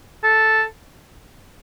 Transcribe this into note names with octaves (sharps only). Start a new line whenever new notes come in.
A4